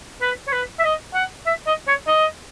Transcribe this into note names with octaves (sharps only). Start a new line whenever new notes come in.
B4
C#5
B4
E5
D#5
F#5
E5
D#5
C#5
D#5